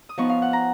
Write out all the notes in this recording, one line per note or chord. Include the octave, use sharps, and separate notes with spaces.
D#6
F3 B3 D#4 C#6
F5
F#5
A#5